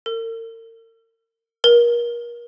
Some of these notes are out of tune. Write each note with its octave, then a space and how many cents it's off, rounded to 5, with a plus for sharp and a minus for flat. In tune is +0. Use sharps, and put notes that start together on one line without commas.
A#4 -40
A#4 +35